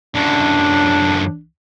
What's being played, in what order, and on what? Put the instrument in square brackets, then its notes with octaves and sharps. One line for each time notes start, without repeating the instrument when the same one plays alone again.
[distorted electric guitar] F#2 D3 [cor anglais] D4